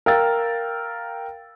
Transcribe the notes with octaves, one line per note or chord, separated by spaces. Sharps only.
A#4 F5 G5 E6 A6